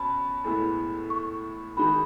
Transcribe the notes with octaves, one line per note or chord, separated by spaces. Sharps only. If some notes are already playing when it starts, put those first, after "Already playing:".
Already playing: B2 C#4 B5
A2 G#3 B3 E4
C#6
D#3 G#3 D#4 F#4 B5